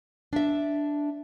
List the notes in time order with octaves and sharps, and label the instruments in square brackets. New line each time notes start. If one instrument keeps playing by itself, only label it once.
[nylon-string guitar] D4 E5